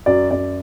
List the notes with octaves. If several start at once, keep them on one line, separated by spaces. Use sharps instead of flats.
F#2 D5
F#2 D5